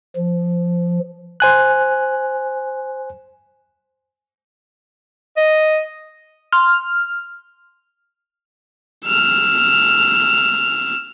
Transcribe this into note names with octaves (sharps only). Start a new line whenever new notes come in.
F3
C5 G#5 F#6
D#5
C6 F6
E6 F6